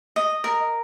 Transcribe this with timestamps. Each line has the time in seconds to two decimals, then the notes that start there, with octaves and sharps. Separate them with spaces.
0.16 D#5
0.44 A#4